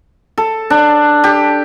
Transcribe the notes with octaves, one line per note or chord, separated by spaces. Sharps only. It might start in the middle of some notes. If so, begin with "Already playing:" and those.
A4
D4
G4